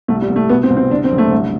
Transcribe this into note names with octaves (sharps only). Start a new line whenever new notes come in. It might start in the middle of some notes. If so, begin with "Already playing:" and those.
C2 A3
G3
C2
A3
B2 B3
C4
C2
C4
D3 D4
C4
F#1
A3
C2